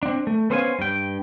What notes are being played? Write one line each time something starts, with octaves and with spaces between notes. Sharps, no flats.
C4 D4
A3
B3 C#4 C5 C#5 F5 G#5
G2 G5